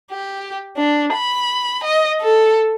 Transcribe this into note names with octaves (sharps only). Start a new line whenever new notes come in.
G4
D4
B5
D#5
A4